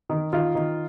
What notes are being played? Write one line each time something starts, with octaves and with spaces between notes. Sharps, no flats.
D#3
D#3 F4
D#3